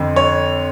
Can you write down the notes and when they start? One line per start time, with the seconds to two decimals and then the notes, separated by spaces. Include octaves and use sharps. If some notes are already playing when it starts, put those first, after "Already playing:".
Already playing: F2 D3
0.16 C#5